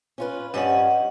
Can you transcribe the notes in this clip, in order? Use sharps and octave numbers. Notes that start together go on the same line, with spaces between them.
C#4 F4 B4
G2 F3 C#4 D#5 F#5